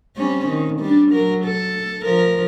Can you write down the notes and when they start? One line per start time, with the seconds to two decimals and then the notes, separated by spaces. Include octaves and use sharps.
0.17 G3 C4 C#4
0.48 D#3
0.80 G3 D4
1.11 F#3 A#4
1.45 A4
2.04 F3 A#4